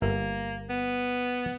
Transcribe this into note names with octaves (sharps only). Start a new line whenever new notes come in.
G1 A#3 A#4 E5
B3